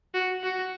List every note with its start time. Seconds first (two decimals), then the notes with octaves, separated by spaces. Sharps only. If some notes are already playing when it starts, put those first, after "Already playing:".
0.14 F#4
0.43 F#4